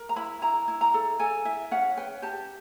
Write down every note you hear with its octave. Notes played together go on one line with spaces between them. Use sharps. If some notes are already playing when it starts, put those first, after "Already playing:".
Already playing: A#4
A#5
E4 B5
E4 A#5
E4
A#5
A4
A4 G#5
E4 E5
C#4 F#5
B4 G5
G4 A5